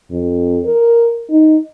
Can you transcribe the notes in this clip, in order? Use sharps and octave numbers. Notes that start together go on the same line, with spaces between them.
F2
A#4
D#4